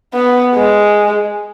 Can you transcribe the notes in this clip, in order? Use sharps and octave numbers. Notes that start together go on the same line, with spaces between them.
B3
G#3